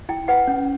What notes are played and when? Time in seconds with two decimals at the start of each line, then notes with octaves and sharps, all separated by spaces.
0.09 E4 G5
0.28 B4 F#5
0.47 C#4